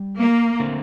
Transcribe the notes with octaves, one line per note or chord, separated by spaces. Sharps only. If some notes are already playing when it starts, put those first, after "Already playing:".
Already playing: G3
A#3
D3 A3 C4